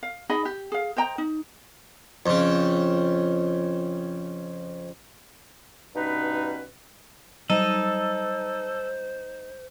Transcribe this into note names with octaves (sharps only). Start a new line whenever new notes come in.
F5
D#4 G#4 D#5 B5
G4
G#4 F5
C5 D#5 G5 A#5
D#4
F2 C#3
G2 B2 C#4 D#4 B4
F#3 G3 D#4 A4 C5